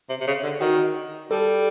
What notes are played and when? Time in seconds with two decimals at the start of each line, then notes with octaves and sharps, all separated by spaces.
0.10 C3
0.21 C3
0.27 C#3
0.44 D3
0.61 D#3 F#4
1.31 G3 A4